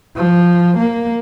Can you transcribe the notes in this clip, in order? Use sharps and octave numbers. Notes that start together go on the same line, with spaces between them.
F3
A#3